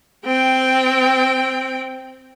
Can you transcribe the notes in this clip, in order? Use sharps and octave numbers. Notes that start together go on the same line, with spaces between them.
C4 G5